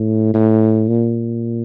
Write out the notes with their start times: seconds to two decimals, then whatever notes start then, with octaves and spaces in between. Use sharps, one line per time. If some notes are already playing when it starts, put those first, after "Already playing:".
Already playing: A2
0.34 A2
0.88 A#2